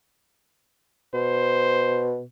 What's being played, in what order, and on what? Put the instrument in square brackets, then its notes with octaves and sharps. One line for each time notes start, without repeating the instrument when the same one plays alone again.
[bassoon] B2 [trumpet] C5